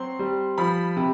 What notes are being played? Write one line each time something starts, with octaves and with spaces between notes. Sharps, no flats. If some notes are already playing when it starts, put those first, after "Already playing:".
Already playing: F#3 C4 C6
G3
F3 B5
C3